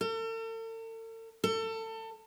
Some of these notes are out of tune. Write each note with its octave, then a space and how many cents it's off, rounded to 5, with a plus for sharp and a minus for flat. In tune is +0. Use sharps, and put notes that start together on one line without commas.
A4 +45
A4 +30